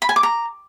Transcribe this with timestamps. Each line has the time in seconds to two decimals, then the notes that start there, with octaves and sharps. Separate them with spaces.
0.02 B5
0.09 G#5
0.16 D6
0.23 A#5